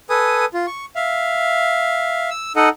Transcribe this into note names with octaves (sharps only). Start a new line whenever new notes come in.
A4 B4 G#5 D#6
F4
C#6
E5 F5
E6
D#4 A4 D#5 F#5